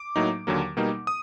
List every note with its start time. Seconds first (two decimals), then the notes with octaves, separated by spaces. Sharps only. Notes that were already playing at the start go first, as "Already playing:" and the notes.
Already playing: D6
0.16 A2 F#3 A#3 D#4
0.47 D#2 D3 F#3 A#3
0.77 B2 G3 A#3 D#4
1.07 D#6